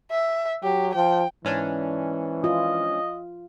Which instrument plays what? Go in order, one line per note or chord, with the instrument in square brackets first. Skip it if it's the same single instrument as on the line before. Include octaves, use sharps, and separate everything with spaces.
[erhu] E5
[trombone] F#3 [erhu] G4
[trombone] F3 [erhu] G5
[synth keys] G#2 C#4 D4 [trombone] E3
[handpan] F4 [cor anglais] D#5